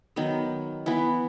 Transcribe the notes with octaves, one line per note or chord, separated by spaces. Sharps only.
D#3 F#3 B3
E3 B3